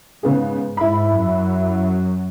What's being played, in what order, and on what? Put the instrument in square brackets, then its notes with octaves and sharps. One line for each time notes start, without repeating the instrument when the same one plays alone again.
[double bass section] G#2 [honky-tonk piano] C#3 B3 G#4
[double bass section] G#2 [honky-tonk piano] E4 B5
[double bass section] F#2 F#3